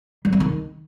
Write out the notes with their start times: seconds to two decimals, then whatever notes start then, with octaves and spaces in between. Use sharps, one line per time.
0.25 G3
0.33 C4
0.40 D#3